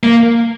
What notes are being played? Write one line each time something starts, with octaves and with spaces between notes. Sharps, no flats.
A#3